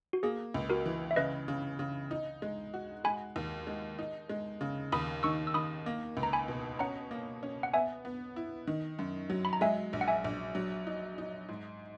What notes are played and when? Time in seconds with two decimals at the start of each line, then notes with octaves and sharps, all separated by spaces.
0.13 F#4
0.23 A#3 G#4
0.54 C#2
0.70 F#4 A#4
0.86 E3
1.11 E5
1.16 C#3 B4 D#5
1.48 C#3
1.79 C#3
2.11 D#4
2.42 G#3
2.74 F#4
3.04 G#3 G#5 B5
3.36 D#2
3.67 G#3
3.99 D#4
4.29 G#3
4.61 C#3
4.92 D#2 B5 D#6
5.23 D#3 C#6 E6
5.47 E6
5.54 D#3 B5 D#6
5.86 A#3
6.17 C#2
6.23 A#5
6.33 G#5 B5
6.48 B2
6.79 C#4 F#5 A#5
7.11 A#3
7.43 C#4
7.63 F#5
7.73 B3 E5 G#5
8.05 B3
8.36 E4
8.67 D#3
8.99 F#2
9.30 F#3
9.45 B5
9.53 A#5
9.61 G#3 E5 G#5
9.93 A#1
10.01 F#5
10.08 E5 G#5
10.24 A#1
10.55 F#3
10.87 D#4
11.18 D#4
11.49 G#2